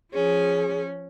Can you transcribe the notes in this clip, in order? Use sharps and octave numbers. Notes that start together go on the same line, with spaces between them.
F3 C#4 G#4